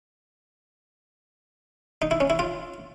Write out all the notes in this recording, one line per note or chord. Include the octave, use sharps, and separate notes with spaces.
D#4
E4
C#4
E4
F4